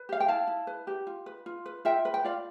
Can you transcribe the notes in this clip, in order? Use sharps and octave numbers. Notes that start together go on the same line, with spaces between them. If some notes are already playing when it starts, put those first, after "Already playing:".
Already playing: B4
G4 F5
G5
E4 F5 A5
E4
B4
G4
F4
B4
F4
B4
F4 E5 G5
B4
G5
F4 D5 F5